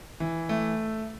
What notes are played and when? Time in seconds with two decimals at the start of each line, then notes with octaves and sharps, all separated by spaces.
0.20 E3
0.49 A3